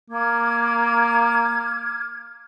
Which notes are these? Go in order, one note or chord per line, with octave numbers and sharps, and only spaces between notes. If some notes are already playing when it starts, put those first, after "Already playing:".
A#3 D6 F6 G#6